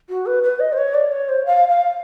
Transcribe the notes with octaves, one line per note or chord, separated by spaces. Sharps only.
F#4
B4
B4
D#5
C5
C#5
D5
C#5
C5
F5
F5